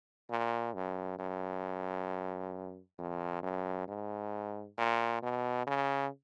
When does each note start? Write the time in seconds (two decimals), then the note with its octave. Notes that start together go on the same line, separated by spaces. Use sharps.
0.30 A#2
0.74 F#2
1.19 F#2
2.98 F2
3.43 F#2
3.88 G#2
4.78 A#2
5.23 B2
5.67 C#3